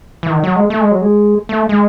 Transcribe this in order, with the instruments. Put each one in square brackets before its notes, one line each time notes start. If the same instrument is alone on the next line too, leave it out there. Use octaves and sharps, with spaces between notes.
[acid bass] E3
D#3
F#3
G#3
A3
G#3
F#3
G#3
A3
G#3